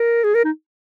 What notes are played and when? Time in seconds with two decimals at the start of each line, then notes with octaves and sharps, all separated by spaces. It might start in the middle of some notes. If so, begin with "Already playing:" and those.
Already playing: A#4
0.24 G#4
0.34 A#4
0.45 D#4